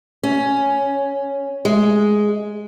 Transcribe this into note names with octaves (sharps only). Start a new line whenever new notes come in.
C#4
G#3